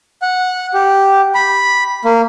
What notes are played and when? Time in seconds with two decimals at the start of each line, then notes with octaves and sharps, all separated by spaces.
0.22 F#5
0.74 G4
1.35 B5
2.05 A#3